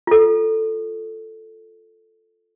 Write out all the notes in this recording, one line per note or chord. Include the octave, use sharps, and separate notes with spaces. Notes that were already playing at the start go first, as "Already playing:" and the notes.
F4 A4